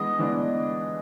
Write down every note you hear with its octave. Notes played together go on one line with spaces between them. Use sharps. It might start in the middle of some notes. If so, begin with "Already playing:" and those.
Already playing: E3 G#3 B3 D4 D#5
E3 G#3 B3 D4